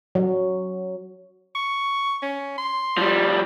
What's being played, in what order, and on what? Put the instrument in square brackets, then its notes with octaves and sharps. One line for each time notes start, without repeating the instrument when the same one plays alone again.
[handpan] F#3
[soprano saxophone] C#6
C#4
C6
[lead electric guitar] F3 G3